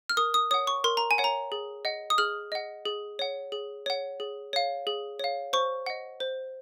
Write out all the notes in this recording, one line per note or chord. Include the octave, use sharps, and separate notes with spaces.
F6
A#4 D#6
D#6
C#5 F#5 D#6
C#6
A#4 C6
A#5
G#5
C#5 F#5
A#5
G#4
D#5 F#5
D#6
G#4 F6
D#5 F#5
G#4
C#5 F#5
G#4
C#5 F#5
G#4
C#5 F5
G#4
C#5 F5
C5 C#6
D#5 F#5
C5